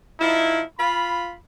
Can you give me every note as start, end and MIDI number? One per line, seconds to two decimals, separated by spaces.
0.20 0.61 53
0.20 0.61 63
0.20 0.61 64
0.78 1.33 65
0.78 1.33 83